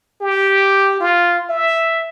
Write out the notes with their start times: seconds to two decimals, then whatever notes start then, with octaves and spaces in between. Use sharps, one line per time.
0.21 G4
1.01 F4
1.50 E5